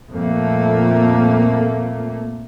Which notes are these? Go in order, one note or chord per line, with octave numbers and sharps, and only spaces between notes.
F2 A#2 A3 A#3